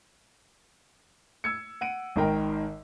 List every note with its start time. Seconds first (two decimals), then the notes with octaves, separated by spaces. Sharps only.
1.44 E6 G#6 C#7
1.81 F#5 D7 D#7
2.16 G#1 D#3 A#4 G5